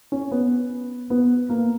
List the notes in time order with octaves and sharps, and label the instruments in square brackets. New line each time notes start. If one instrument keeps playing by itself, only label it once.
[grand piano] C#4
B3
B3
A#3